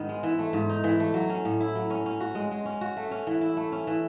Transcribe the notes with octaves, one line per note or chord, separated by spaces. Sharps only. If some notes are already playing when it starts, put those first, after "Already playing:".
Already playing: G#2 D#3 B3
G#3
E3
A3
G#2
D#4
E3
A3
F#3
C#4
A2
E4
F#3
C#4
C#4
F#4
G#3
G#3
C#4
F#4
A3
C#4
E3
E4
A3
C#4
E3